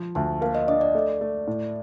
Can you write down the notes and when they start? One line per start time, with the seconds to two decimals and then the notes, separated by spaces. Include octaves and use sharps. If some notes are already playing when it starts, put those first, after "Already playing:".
Already playing: F3
0.15 D2 A5
0.41 A#3 F5
0.55 D#5
0.68 D4 D#5
0.81 D5
0.95 A3
1.21 A3
1.47 A2